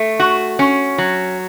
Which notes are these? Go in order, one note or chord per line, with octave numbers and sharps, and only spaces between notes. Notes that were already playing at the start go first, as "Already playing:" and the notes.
Already playing: A3
F#4
C#4
F#3